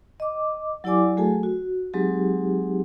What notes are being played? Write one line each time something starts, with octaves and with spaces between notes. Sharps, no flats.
D#5 D6
F#3 E4 G4 D5 G#5 D6
F#3 A3 F#4 G#4 A4 G#5
F#4
F#3 G#3 C4 D#4 G4 G#4